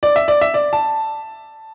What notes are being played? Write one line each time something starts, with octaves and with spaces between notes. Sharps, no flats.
D5
E5
D5
E5
D5
A5